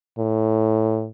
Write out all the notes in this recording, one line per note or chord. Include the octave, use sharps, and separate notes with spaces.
A2